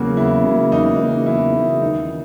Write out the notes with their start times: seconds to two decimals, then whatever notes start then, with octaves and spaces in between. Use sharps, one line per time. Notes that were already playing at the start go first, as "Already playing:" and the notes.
Already playing: E2 C#3 F#3 A#3 F#4
0.16 E2 E4
0.44 C#3 F#3 A#3
0.71 E2 D#4
0.99 C#3 F#3 A#3
1.26 E2 E4
1.55 C#3 F#3 A#3
1.82 D#2 D#4
2.09 C#3